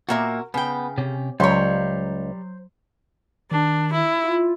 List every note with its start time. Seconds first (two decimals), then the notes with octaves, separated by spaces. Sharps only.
0.09 A#2 A#3 F#4 A#4 E5
0.54 C#3 B3 G5
0.98 C3 C#4 G4
1.40 C#2 F#3 G3 C5 C#5
3.51 D#3 D4
3.93 E4
4.24 F4